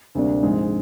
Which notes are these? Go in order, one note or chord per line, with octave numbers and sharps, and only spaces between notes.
D2 C3 G3 A#3 D4
A#1 G#2 D#3 G#3 C4